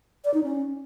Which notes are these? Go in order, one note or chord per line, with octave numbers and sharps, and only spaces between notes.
D5
D#4
C#4